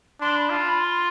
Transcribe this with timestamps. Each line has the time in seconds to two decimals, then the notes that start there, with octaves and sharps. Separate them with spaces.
0.21 D4 C6
0.36 B5
0.50 F4 A5
0.65 B5
0.79 C6